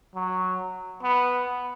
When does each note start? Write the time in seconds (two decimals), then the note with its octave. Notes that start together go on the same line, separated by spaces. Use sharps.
0.15 F#3
1.03 B3